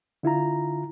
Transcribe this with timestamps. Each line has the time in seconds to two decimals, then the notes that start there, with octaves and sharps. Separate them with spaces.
0.23 D3 E4 F4 A#5